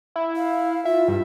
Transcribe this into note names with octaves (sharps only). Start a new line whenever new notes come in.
E4
F5
F4 E5
G2